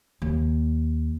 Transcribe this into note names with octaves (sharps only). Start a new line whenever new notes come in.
D#2